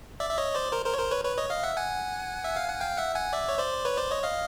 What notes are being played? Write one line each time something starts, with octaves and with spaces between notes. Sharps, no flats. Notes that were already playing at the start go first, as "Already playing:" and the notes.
D5 E5
E5
C#5 D#5
C5 D5
A#4 C5
A#4 C5
C#5
A#4 C5
B4 C#5
B4 C#5
C#5 D#5
D#5 F5
E5 F#5
F#5 G#5
E5
F5
F#5
F5 G5
E5 F#5
F#5 G#5
D5 E5
C#5
C5 D5
B4 C#5
C5 D5
C#5 D#5
D#5 F5